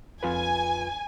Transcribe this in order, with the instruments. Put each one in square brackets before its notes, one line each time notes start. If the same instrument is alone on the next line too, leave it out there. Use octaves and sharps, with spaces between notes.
[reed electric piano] F2 F4 B4 [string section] G#5